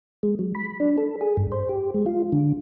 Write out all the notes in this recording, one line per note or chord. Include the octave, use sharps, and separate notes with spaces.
G#3
F#3
B5
D4
A4
G#4
G2
C5
G4
G#3
F4
D3